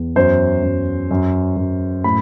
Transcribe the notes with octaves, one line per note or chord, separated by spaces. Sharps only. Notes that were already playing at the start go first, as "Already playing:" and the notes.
Already playing: E2
F#2 C5
F#2
F#2
F#2
A2 B5